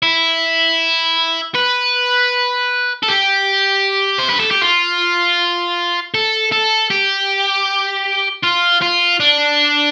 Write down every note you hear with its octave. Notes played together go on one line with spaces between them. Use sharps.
E4
B4
A4
G4
C5
B4
A4
G4
F4
A4
A4
G4
F4
F4
D4